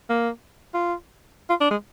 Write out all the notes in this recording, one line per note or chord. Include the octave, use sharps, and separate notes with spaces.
A#3
F4
F4
D4
G#3